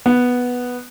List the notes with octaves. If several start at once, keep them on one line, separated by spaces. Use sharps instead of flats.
B3